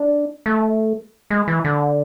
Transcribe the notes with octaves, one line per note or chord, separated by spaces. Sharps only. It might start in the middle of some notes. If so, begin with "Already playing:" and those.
Already playing: D4
A3
G#3
E3
D3